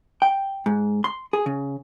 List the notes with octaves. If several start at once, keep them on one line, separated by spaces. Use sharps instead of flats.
G5
G#2
C6
G#4
C#3